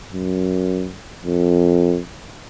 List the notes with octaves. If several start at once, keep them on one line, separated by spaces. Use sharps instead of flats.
F#2
F2